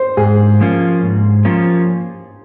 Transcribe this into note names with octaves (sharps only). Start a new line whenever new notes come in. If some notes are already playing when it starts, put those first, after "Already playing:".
Already playing: C5
G#2 G#4
F3 A#3 C#4 F4
G#2
F3 A#3 C#4 F4